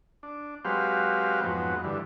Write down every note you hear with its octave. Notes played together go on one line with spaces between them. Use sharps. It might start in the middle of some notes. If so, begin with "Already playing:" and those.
D4
F#3 G#3 C4 G4 B4 F5
F2 G#2 F#3 B3
G2 D3 E3